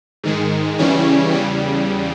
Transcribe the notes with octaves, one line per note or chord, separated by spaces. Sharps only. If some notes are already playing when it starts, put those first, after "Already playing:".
G#2 D#3 G#3
E2 C#3 E3 G3 C#4
E2 C#3 G3